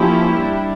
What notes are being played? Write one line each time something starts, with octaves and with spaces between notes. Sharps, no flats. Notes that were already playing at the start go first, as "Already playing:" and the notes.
Already playing: F3 A#3 C#4 E4 G4
G3 D4